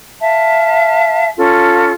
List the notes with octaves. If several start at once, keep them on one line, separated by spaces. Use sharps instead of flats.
E5 F5 A5
C#4 F4 A4